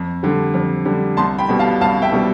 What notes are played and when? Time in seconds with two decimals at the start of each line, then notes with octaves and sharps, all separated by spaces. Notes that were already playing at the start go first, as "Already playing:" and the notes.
Already playing: F2
0.23 D3 G3
0.54 F2
0.85 D3 G3
1.17 C2 A5 C6
1.38 G5 B5
1.49 B2 G3
1.59 F5 A5
1.81 C2 F5 A5
2.02 E5 G5
2.12 B2 G3